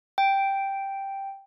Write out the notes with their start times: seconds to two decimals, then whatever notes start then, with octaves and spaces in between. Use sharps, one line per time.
0.18 G5